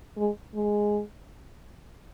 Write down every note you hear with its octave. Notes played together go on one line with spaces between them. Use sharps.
G#3
G#3